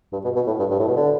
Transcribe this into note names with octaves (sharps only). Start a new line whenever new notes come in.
G2
B2
B2
A2
G2
G2
A2
B2
D3